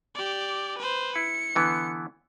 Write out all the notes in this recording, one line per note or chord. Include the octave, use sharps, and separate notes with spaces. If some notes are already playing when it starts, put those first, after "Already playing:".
G4 D5
B4 C5
E4 C#7
D3 E3 B3